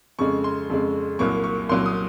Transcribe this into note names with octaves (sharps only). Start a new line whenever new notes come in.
F2 C#3 G#3 C#6
C6
F2 C#3 G#3
C2 A#2 F#3 A#3 C#6
C#6
C2 A#2 F#3 A#3 C6
D#6